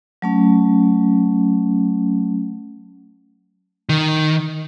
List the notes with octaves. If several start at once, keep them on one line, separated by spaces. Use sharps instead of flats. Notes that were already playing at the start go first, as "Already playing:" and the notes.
F#3 A3 C#4
D#3